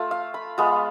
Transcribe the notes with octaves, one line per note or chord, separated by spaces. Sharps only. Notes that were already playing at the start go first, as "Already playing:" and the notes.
Already playing: A3 F4
F5
B5
G#3 B3 F4